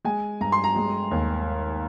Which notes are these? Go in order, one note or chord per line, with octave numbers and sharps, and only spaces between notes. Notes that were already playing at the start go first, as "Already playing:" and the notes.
G#3 G#5
G2 A#5
C6
A#5
G#3
D#2